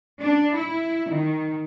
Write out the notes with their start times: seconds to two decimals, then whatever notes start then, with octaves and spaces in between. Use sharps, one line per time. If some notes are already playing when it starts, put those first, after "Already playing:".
0.21 D4
0.55 E4
1.11 D#3